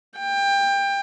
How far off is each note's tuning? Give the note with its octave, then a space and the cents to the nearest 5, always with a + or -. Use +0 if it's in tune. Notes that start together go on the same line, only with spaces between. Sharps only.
G5 +25